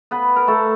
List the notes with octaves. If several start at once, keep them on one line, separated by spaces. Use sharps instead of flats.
B3 B4
A#4
A3 A4